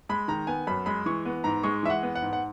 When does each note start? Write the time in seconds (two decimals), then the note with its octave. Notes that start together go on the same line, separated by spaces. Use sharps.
0.09 G#3 B5
0.28 D#3 A#5
0.47 B3 G#5
0.67 F#2 B5
0.86 G#3 B5
1.06 E3 C#6
1.25 B3
1.44 G#2 A#5
1.63 G#3 C#6
1.83 E3 E5
1.90 F#5
2.03 B3
2.15 F#5
2.22 G#2
2.33 F#5